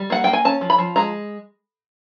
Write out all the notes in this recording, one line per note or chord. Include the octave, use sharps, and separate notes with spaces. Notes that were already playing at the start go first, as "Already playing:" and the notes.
Already playing: G3
A#3 F#5
A#3 G5
G#5
C#4 A5
F3
B5
F3
G#3 A#5